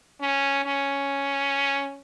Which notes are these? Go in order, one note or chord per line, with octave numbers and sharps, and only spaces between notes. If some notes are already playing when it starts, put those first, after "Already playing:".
C#4
C#4